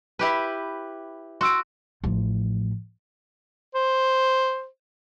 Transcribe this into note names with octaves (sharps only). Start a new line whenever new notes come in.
E4 G4 B4
F#4 C6 E6 D7
A1 F3
C5